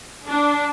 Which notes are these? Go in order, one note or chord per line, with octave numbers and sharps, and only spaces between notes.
D4